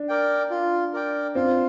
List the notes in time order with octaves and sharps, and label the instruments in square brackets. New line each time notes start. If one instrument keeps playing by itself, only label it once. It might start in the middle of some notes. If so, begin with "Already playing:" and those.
Already playing: [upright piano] D4
[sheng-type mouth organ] A#4 D5 G5
F4
A#4 D5 G5
[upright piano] C4 [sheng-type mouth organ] F4